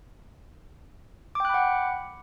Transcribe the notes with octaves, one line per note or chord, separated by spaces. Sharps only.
F#5 G5 B5 D6 F#6